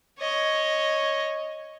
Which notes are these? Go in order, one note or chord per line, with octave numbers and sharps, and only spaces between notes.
C#5 D#5